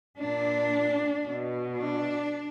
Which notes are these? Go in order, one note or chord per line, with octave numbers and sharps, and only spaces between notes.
A#2 D4
B2
D4